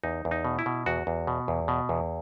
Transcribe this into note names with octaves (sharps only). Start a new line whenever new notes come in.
E2 D#4
E2
D#4
B2
E4
B2
E2 F#4
E2
B2
E2
B2
E2